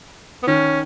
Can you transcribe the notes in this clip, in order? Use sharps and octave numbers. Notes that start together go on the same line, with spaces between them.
B3
D#3 C#4